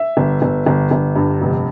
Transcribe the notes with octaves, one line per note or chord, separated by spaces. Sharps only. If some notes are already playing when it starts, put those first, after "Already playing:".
Already playing: E5
G1
G1
G1
G1
G2
F1